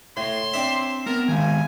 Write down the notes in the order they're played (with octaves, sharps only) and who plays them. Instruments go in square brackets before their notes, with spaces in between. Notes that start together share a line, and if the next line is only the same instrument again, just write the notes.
[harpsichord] A2 [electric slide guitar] C#5 [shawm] C6
[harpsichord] C4 D4 E5
[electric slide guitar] B3 [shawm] A#4
[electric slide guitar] D#3 G#3 F5 [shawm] G#5